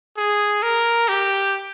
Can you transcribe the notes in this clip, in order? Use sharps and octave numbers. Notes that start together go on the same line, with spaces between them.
G#4
A#4
G4